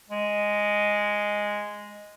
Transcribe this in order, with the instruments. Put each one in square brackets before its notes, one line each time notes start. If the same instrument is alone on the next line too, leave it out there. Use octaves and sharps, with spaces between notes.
[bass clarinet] G#3